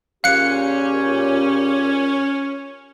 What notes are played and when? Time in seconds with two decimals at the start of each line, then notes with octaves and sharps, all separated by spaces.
0.24 A#2 C#3 C#4 G4 F5 F#6 C#7